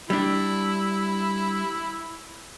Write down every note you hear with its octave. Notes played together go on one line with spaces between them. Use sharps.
G3 D4 E4